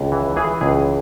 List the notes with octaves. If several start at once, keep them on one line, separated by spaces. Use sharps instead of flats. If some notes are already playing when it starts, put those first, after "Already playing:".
Already playing: C#2
E3
E3 G#4
C#2 G#4